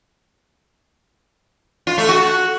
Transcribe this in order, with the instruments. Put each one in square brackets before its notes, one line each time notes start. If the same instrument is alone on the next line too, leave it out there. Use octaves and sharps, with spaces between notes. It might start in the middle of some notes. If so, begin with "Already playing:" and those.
[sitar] F4
A3
F#4